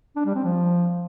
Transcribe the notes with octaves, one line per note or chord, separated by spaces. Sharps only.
D4
G3
C4
F3